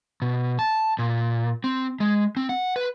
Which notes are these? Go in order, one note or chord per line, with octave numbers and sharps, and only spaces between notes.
B2
A5
A#2
C4
G#3
C4
F#5
B4